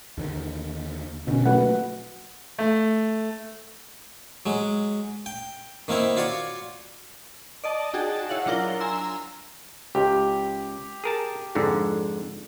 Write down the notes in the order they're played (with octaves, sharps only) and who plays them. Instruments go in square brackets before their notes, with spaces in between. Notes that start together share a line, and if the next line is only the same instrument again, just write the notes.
[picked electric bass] D#2 D3 D#3
[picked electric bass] G1 D3 D#3 [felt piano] B2 C#4
[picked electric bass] F#3 A3 A#3 [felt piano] F#4 B4 F#5
[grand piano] A3
[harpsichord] F#3 G#3
G5
D#3 A#3 C4 E4
F4 F#4 C#5 D5
[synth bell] D5 D#5 A5
D#4 F#4 G#4 G5 A5
E4 C#5 F5 F#5
F#3 D4 F4 A#4 G7
G#5 A#5 C6 E6
[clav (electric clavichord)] C#2 [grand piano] G4
[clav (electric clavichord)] G#4 A#4 A5
F2 G#2 D3